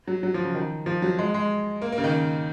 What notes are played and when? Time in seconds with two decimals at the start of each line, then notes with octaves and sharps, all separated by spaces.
0.08 F#3
0.23 F#3
0.34 F3
0.44 C#3
0.54 D#3
0.86 F3
1.02 F#3
1.18 G#3
1.34 G#3
1.82 A#3
1.92 A#3
1.98 C#3
2.04 D#3